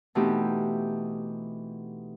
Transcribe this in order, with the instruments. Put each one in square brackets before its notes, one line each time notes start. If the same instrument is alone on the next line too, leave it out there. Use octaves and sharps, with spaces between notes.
[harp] B2 E3 A3 C4 D#4 G4